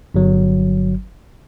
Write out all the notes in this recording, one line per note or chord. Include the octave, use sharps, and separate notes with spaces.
G1 F#3